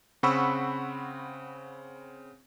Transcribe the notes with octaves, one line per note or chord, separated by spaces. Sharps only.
C#3 C4 F#5 B5 C#6 E6